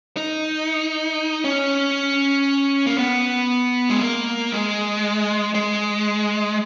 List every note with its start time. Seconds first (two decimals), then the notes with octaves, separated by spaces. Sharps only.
0.17 D#4
1.44 C#4
2.86 A#3
2.98 B3
3.90 G#3
4.01 A#3
4.52 G#3
5.55 G#3